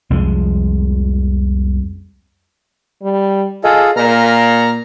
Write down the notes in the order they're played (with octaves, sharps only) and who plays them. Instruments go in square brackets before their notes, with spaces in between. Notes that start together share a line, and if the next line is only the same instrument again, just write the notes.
[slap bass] C2 F2 F3 G#3
[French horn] G3
[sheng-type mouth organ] F4 G#4 A4 [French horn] D#5
[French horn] A#2 [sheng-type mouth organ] A#5 F6